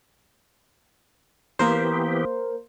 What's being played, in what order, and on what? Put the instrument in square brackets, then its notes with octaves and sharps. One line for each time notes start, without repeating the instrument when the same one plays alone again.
[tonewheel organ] E3 B3 G4 [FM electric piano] A#3 A#4 C5